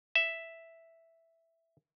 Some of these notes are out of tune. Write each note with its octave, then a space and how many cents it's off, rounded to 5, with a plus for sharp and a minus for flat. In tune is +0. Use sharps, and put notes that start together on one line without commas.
E5 +0